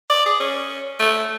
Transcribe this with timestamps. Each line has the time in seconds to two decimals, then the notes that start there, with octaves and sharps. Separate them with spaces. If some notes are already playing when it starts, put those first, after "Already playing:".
0.10 D5
0.26 G#4
0.40 C#4
1.00 A3